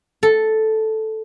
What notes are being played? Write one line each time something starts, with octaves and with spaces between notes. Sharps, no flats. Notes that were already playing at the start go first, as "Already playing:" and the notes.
A4